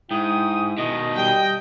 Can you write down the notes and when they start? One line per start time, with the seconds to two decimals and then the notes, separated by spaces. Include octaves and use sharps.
0.11 G#2 E4 G5 D#6
0.78 B2 D#3 D#5
1.16 G3 G5